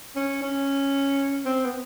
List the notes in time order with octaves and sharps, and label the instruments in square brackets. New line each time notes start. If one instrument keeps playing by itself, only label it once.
[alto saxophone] C#4
C#4
C4
B3